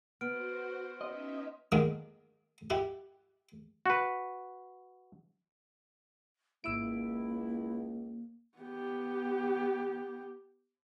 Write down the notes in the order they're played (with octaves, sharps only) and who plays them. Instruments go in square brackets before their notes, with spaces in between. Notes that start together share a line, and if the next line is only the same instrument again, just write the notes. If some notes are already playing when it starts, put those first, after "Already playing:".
[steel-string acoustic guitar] B3 [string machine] F#4 C5 [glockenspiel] F6 D7
[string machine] C#4 D#4 E5 [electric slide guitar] D#5 [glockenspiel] C6
[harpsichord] D3 D#3 G#3 A#3 D4 A#4
E4 G4 F#5
[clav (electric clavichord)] F#4 B4
[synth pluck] G#1 E6 D7 [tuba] C#2 [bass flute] A#3 [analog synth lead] E4
[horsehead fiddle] B3 G4